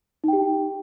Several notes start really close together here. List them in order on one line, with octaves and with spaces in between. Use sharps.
D#4 G5 G4